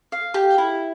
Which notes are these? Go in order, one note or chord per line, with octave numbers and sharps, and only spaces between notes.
F5
G4
E4